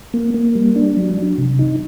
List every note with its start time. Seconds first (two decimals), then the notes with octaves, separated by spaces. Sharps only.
0.14 A#3
0.34 A#3
0.55 G3
0.76 D4
0.97 F#3
1.17 F#3
1.38 C3
1.59 D#4